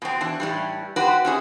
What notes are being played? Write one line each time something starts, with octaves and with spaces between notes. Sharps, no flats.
B2 C4
E3 D4
A2 E3 G3
F#4 G4 B4 C5
C#4 E4 G#4